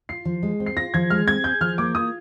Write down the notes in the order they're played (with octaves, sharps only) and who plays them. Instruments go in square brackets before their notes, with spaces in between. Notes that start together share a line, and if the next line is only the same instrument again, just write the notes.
[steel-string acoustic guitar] F4 [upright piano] C7
[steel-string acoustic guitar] F3
G#3
C4
[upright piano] C7
[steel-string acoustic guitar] F4 [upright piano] A#6
[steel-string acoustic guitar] F3 [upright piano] G#6
[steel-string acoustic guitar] G#3 [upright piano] F6
[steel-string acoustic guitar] C4 [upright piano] G#6
[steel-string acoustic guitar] G#4 [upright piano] G6
[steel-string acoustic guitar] F3 [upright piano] F6
[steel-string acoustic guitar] A#3 [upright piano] D6
[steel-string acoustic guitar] F4 [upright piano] D#6